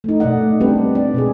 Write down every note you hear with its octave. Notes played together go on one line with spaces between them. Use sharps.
A3 D#4
B2 A3 D5 D#5 F#5
G3 C4 D4 D#4 G4 B4
D5
B2 G#3 G#4